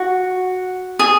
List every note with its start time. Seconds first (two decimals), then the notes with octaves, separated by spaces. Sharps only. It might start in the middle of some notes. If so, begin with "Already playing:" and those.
Already playing: F#4
0.99 G#4